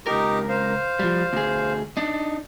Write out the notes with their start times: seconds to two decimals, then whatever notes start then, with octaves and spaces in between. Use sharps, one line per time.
0.07 C#2 D#4 G4 A#4
0.49 C5 F5
0.99 F3 G3
1.33 D2 G#4
1.97 D4 D#4